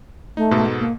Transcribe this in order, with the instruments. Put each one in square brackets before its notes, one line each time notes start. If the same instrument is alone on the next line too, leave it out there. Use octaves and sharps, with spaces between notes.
[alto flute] A3 [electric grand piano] D#4
[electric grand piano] G#2 B2 A4
[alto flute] A#3